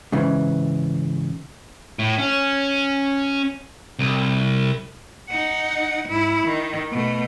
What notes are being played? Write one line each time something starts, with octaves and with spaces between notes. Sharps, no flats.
G#2 C#3 E3
A2
C#4
C2
D#4 F#5
G#2 E4
D#3
B2 A3